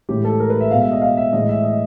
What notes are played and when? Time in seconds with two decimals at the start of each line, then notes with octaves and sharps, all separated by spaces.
0.09 A2 E3 G#3 G4
0.25 A4
0.40 A#4
0.50 B4
0.60 E5
0.71 B2 G#3 F5
0.81 E5
0.92 D#5
1.02 F5
1.17 E5
1.32 A2 E3 G#3 D#5
1.49 E5
1.63 D#5